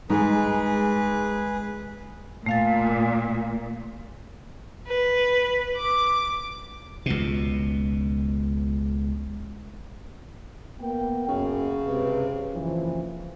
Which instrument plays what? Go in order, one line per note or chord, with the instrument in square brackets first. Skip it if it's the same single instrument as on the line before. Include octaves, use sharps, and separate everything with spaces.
[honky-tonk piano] G#2 [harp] G#3 [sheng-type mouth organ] G#4 B4
[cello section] A#2 [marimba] A3 F5 A6
[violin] B4
D6
[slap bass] C#2 B2
[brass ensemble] A#3 B3 G5
[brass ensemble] F#2 [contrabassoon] C#3
[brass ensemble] C#2 C3 B4
F#1 E3 F3